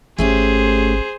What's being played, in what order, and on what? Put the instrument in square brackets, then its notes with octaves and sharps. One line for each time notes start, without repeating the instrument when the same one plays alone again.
[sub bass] G#1 [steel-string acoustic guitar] A3 C#4 G4 [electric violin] G#4 C5